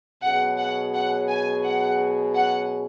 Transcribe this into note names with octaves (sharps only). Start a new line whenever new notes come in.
B2 F#3 C#4 G#4 F#5
F#5
F#5
G#5
F#5
F#5